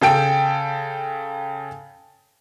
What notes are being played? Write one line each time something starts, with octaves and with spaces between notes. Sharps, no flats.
C#3 A4 G5 D7